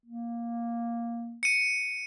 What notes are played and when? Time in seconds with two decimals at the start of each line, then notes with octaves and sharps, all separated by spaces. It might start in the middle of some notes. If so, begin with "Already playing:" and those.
0.06 A#3
1.43 C#7 D#7